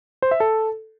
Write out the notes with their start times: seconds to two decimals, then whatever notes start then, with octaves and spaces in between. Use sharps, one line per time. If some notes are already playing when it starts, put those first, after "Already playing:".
0.22 C5
0.31 E5
0.40 A4